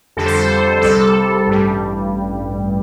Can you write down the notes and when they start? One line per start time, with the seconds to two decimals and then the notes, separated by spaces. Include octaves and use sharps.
0.17 F2 D3 G3 A4
0.26 C5
0.34 A4
0.81 C2 C3 G3 A4
1.46 A1 G2 G3